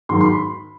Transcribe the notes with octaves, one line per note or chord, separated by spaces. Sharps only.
G#2 D#3 F#3 C6
C6
B5